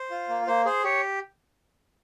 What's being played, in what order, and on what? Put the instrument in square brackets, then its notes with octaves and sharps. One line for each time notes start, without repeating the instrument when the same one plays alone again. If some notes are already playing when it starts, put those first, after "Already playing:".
Already playing: [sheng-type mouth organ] C5
F4
A#3
A#3 C5
G#4 C5
G4 C#5